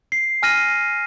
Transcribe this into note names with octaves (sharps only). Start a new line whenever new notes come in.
C7
G#5 F6 A#6 D#7